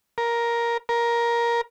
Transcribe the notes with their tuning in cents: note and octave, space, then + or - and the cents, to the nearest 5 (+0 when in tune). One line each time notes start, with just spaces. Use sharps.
A#4 +10
A#4 +15